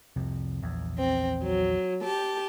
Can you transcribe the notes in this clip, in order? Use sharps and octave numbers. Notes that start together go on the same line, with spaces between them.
C2 F2 C3
A#1 E2
C4
F#3
G4 A5